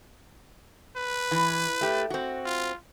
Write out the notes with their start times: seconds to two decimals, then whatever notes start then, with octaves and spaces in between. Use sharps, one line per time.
0.97 B4
1.31 E3
1.81 A3 G4
2.10 C4 F#4
2.45 F4